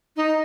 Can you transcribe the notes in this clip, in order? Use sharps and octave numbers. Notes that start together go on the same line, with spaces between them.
D#4